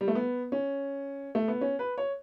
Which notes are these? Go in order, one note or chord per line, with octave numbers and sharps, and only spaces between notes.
G3
A3
B3
C#4
A3
B3
C#4
B4
C#5